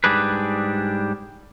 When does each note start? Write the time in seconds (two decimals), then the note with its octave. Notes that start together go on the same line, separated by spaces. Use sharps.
0.04 G#2 G3 D4 G#4 B4